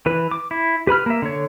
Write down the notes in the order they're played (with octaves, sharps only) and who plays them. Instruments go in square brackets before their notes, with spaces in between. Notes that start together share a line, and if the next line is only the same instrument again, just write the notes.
[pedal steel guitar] E3 B4
D6
E4
G4 B4 B5 F6
A#3 E5
D3 C#5